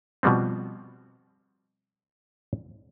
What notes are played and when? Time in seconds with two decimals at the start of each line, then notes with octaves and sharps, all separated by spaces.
0.23 B2 F3 G3 B3 C4